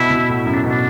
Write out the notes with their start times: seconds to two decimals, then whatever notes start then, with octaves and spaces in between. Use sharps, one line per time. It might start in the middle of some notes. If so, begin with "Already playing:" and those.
Already playing: B2 E4
0.10 B2
0.29 A2
0.46 F#2 E4
0.54 D4
0.65 B2 D4